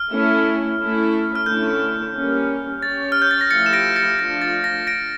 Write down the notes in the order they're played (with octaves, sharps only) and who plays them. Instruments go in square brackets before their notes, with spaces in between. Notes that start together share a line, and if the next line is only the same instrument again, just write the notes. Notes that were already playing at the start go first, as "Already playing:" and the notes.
Already playing: [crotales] F6
[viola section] A3 C#4 E4 A4
A3 C#4 E4 A4
[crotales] F6
[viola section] D3 A3 C#4 E4 A4 [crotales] G6
[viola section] G3 A#3 C#4
[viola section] C#4 G4 C#5 [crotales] A6
[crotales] F6
G6
A6
A#6
[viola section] F3 A3 E4 G4 [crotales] A6 C#7
[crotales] E7
A#6 D7
A6 C#7
[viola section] F3 A3 D4 F4 [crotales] A#6
[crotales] A6
A#6
A#6 D7